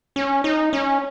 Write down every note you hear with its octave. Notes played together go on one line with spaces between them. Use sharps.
C#4
D#4
C#4